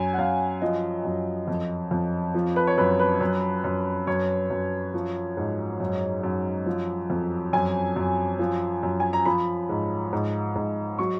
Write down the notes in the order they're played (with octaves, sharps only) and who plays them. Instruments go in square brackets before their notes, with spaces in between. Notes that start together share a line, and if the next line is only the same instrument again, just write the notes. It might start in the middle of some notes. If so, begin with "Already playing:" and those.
Already playing: [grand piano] F#2 G#5
F#5
F#2 F5
F3 D#5
F#2
F2
F2
F3
B4
C#5
F#2 B4
B4
F#2
F#2
F#2 C#5
F#2
F3
G#2
F#2
F#2
F3
F2
F#2 G#5
F#2
F3
F#2
G#5
A#5
F3 B5
G#2
G#2
G#2
F#3 C#6